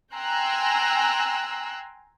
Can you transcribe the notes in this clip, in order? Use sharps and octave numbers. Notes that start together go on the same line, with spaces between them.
G5 G#5 A#5 C6 E6 F#6